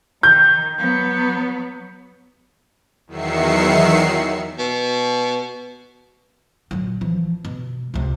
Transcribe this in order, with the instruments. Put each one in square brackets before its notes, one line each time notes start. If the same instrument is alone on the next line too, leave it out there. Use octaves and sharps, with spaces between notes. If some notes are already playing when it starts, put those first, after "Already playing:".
[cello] D#3 D#4 [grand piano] G6
[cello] F#3 B3
[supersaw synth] E2 D#3 F#3 E5 C7 C#7
[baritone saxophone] B2
[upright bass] A#2 F#3
E3 F3
B2
C#2 C3